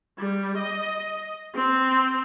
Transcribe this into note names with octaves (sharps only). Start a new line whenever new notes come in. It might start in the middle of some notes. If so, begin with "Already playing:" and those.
G3
D#5
C4